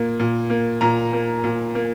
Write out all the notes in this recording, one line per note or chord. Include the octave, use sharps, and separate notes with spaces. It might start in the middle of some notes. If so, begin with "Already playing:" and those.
Already playing: A#2 A#3
A#2
A#3
A#2 A#5
A#3
A#2
A#3